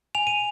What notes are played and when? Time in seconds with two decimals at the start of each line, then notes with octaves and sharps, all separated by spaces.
0.15 G#5 F7
0.27 D#7